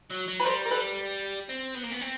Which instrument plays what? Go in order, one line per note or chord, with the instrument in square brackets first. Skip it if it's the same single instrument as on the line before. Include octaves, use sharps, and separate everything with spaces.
[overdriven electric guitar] F#3
F#3
[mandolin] B4
[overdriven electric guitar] G3 [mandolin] A#4 C5
[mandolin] A#4
A4 B4
[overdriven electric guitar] C4
B3
A#3
B3
C4